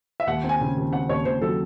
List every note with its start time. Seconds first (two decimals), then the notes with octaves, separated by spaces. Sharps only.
0.20 E5
0.27 D#2 F#5
0.44 C4
0.49 G#5
0.61 C#3
0.77 D#2
0.92 C4 F#5
1.09 D#2 C#5
1.25 D#2 C5
1.42 F#3 A4